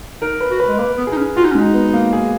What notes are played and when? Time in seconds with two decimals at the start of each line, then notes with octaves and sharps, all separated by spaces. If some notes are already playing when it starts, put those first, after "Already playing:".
0.22 D#4 A#4
0.41 B4
0.51 F#4
0.60 B4
0.68 G#3
0.79 A#3 B4
0.98 B3
1.07 G#4
1.12 D#4
1.17 C#4
1.36 F4 F#4
1.44 D#4
1.52 C#4
1.55 G#3 D#4
1.74 B3
1.94 A#3
2.13 G#4